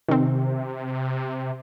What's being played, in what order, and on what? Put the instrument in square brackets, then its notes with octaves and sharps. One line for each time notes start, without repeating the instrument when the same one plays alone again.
[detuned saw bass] C3 [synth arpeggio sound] D#3 C4